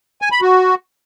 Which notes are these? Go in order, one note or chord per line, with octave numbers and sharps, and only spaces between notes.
G#5
B5
F#4